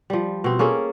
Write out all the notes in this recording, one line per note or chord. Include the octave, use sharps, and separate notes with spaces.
F3 G3
B2 C4
A#3 C#4 G#4 A4